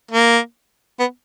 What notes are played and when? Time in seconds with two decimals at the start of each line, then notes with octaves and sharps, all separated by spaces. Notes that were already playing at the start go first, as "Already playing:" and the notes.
0.11 A#3
1.00 B3